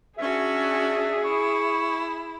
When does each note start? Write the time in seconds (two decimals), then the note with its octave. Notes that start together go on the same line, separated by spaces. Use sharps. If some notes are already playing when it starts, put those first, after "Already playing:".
0.18 C#4 D4 F#4 G#4 E5
1.25 E4 C#6